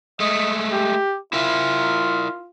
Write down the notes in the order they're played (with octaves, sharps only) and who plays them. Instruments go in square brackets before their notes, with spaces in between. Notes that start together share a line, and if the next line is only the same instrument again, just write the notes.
[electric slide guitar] G#3 A3 [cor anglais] D#5
[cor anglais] G4
[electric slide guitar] E4 A#4 E5 [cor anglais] F4